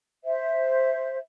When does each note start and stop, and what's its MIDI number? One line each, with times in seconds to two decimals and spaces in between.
0.24 1.18 72
0.24 1.18 76